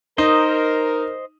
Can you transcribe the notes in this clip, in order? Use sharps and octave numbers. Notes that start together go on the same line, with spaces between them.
D#4 A#4 C5 D#5